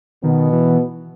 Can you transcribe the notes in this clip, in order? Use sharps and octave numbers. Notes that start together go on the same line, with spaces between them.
B2 D#3 B3
E3